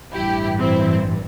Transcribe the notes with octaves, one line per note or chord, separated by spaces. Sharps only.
A1 G2 E3 E4 G4
C4 E4